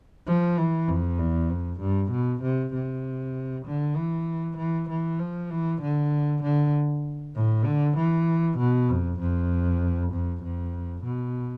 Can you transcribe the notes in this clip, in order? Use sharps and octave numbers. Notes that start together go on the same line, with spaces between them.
F3
E3
F2
E2
F2
G2
B2
C3
C3
D3
E3
E3
E3
F3
E3
D3
D3
A2
D3
E3
B2
F2
F2
F2
F2
B2